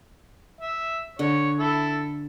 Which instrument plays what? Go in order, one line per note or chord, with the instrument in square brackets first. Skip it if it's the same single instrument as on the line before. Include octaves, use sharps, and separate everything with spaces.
[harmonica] E5
[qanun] D3 [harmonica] C#5
[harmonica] E4 A4